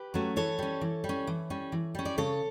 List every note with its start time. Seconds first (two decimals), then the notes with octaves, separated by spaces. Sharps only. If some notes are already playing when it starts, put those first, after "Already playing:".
Already playing: G4 B4
0.14 F#3 A3 C#4
0.36 E3 A4 C#5
0.59 G3 C#4
0.81 E3
1.04 G3
1.09 C#4
1.27 E3
1.50 G3 C#4
1.72 E3
1.95 G3 C#4
2.05 D5
2.18 C#3 A4 C#5